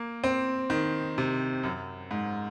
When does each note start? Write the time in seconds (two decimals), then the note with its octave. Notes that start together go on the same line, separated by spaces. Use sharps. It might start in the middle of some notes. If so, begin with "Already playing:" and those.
Already playing: A#3
0.24 C4
0.70 D#3
1.18 C3
1.63 F#2
2.11 G#2